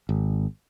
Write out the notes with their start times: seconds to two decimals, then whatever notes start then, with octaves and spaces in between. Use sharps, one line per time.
0.09 G#1